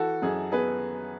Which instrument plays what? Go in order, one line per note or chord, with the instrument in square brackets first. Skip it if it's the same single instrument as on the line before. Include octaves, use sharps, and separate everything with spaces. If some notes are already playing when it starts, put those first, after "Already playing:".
Already playing: [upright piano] E3 F#4 A4
F#2 G#4
B3 G#4 B4